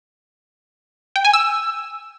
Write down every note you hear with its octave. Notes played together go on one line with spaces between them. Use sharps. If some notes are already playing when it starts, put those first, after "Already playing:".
G5
G#5
E6